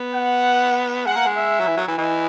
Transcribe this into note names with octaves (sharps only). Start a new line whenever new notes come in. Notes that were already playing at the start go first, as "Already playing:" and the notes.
Already playing: B3
F#5
G#3 F#5
A#3
G#3
E5
F#3
E3
F#3
E3
E3 D#5